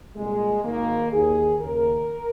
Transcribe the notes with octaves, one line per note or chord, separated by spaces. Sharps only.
C2 A#2 G#3
G#1 G#2 D#3 A#3
D#2 D#3 G#4
D#2 C#3 A#4